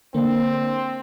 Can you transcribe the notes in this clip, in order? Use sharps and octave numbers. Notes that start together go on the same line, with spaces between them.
D3 A#3 C4 D4